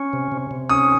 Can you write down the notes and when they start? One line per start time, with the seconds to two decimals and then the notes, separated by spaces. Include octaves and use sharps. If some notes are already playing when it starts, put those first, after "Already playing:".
Already playing: C#4
0.13 C3
0.32 C3
0.51 C3
0.69 C#4 D#6